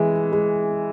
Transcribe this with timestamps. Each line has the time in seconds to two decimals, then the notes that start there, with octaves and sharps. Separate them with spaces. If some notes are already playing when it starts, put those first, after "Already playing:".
Already playing: E3 G#3
0.32 G#3